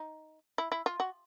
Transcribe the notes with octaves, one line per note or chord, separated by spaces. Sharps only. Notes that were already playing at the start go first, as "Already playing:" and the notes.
Already playing: D#4
E4
E4
F4
F#4